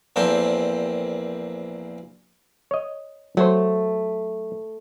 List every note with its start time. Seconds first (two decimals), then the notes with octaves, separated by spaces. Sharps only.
0.16 A#1 E2 A#3 C4 A4 G5
2.71 C#5 D#5
3.37 F#3 A3 C5